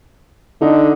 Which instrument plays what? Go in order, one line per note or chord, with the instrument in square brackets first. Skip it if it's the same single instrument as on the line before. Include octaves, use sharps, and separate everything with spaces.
[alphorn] D3 [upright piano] D#4